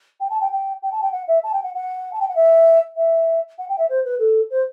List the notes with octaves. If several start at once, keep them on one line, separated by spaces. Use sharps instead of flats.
G5
A5
G5
G5
G5
A5
G5
F#5
E5
A5
G5
F#5
F#5
A5
G5
F#5
E5
E5
F#5
G5
E5
C5
B4
A4
C5